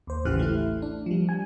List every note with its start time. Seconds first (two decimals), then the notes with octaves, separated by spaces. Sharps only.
0.07 D#2 C5
0.25 A1 C#3 E3 G4 F6 F#6
0.39 A3 E4
0.82 D4
1.06 F3 G3
1.29 G#5